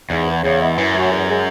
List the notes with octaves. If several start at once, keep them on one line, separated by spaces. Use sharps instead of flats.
E2 G#2
E3 B3
E2 C#3
G#3 B3 E4
F#2 E3
A3 C#4 F#4
E2
C#3 G#3